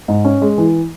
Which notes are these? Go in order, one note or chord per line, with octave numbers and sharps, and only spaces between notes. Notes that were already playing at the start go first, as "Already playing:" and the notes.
G#2
C#4
G#3
E3